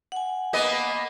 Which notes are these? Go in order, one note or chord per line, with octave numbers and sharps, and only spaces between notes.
F#5 G#5
A#3 B3 D#5